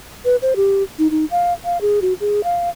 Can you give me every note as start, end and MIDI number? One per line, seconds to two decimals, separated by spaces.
0.25 0.36 71
0.42 0.54 72
0.56 0.83 67
0.99 1.08 63
1.11 1.25 63
1.31 1.53 77
1.65 1.81 77
1.81 2.00 68
2.02 2.13 66
2.21 2.44 68
2.44 2.69 77